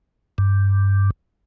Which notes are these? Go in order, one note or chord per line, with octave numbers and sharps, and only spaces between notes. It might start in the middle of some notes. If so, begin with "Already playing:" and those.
G2